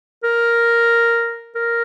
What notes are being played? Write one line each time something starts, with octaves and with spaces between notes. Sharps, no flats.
A#4
A#4